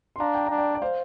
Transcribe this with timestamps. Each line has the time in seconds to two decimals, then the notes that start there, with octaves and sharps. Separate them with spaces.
0.16 C6
0.20 D4 F5 A#5
0.35 G5
0.46 D4 A#5
0.58 D5 G5
0.75 D5
0.82 C5 F5